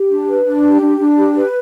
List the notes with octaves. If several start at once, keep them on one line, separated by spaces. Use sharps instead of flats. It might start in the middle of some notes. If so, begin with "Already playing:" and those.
Already playing: G4
D4
B4
D4
G4
D4
D4
G4
B4